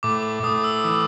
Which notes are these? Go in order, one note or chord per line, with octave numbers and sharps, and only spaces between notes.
A2 D6
D6
A2 D#6
E6
E3